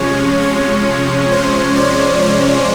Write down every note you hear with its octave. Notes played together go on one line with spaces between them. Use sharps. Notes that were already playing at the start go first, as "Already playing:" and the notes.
Already playing: C3 F3 G#3 C#4 C#5
C#5
C5
D5
C#5